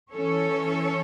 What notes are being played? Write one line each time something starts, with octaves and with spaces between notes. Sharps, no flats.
E3 C#4 A4 C#5